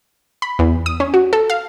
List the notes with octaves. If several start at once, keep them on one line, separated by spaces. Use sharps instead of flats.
B5
E2
D#6
C#4
F#4
A4
F5